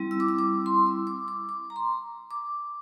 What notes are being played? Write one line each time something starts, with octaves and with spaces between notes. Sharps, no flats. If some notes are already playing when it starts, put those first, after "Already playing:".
Already playing: G3 C4 E4
E6
D6
E6
D6
C6
E6
D6
D6
D6
A#5
C6
D6